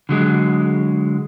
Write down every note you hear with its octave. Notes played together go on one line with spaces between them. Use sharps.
D3 F#3 G#3